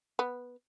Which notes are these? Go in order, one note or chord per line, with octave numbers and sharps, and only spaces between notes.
B3